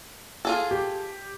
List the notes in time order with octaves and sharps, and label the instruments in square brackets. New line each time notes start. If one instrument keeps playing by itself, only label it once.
[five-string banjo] F4 G#4 A4
[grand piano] G4